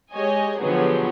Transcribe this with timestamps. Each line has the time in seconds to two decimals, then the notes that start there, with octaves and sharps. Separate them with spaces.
0.13 G#3 G4 C#5 D#5 G#5
0.59 D3 F3 F#3 B3 G4 G#4